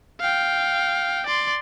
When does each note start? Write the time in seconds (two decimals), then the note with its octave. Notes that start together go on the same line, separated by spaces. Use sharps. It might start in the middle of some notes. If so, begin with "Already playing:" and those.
0.20 F5 G5
1.26 D5 C6